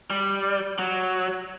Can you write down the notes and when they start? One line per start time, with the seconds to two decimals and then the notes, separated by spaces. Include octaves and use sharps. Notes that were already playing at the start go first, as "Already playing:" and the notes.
0.10 G3
0.79 F#3